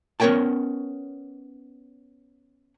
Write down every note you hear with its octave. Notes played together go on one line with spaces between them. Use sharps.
B3 C#4 A#4 C#5 G5 A5